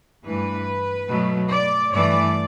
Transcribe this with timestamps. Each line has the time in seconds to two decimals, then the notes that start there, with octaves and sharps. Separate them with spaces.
0.25 G2 E3 A3 B4
1.09 B2 F#3 A3
1.51 D5
1.93 G2 E3 A3 D5